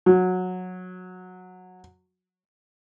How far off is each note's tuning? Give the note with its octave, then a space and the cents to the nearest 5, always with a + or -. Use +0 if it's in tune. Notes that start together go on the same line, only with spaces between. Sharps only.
F#3 -15